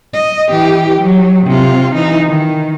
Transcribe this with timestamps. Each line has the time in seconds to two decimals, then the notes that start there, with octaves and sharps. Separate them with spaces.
0.14 D#5
0.50 E3 G4
1.01 F#3
1.47 C3 F4
1.95 E3 D#4
2.29 D#3